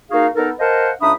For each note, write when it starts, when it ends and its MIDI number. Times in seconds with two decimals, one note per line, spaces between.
0.11 0.27 58
0.11 0.27 63
0.11 0.27 66
0.11 0.27 68
0.11 0.27 77
0.36 0.50 59
0.36 0.50 63
0.36 0.50 69
0.36 0.50 70
0.59 0.89 70
0.59 0.89 72
0.59 0.89 75
0.59 0.89 77
0.59 0.89 78
0.59 0.89 81
1.01 1.11 37
1.01 1.11 62
1.01 1.11 63
1.01 1.11 76
1.01 1.11 83
1.01 1.11 87